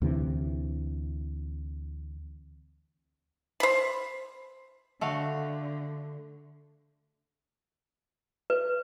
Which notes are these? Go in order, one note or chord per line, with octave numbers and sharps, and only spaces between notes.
D2 C3 E3
C5 B5
D3 A3 F#4 F5
B4